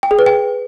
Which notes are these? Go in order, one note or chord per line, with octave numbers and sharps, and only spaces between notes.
G5
G#4
B4
G5